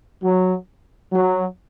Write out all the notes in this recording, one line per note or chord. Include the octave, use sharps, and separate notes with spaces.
F#3
F#3